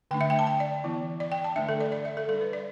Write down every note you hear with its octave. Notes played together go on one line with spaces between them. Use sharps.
D3 A3 D4 G5
E5
G5
A5
G5
D5
E3 B3 E4
D5
G5
A5
D3 A3 D4 E5
A4
D5
D5
E5
A4
G3 D4 A4
B4
D5